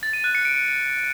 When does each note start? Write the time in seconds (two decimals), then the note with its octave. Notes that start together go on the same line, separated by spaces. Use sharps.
0.03 A6
0.13 D#7
0.24 F#6
0.35 C#7
0.45 D7